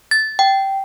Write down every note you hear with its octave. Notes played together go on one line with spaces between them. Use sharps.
A6
G5